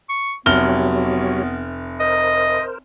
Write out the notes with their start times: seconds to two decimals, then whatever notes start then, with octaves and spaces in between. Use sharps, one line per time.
0.09 C#6
0.46 F1 F#3 B3 G4 C#5 F6 G7
2.00 A#4 C5 D#5